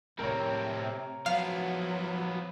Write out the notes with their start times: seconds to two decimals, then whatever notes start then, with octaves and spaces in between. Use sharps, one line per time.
0.19 A2 C3 C4 A#4 C#5
1.26 F3 F#3 B3 F5